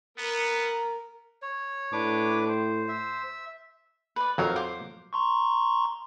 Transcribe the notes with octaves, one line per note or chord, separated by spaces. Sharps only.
B3 A#4 A#5
C#5
A2 D4 B4 D6
C5
E5
B4 D5
F2 F#3 D#4 A#4 F5
C5 D6
A#5 C6 C#6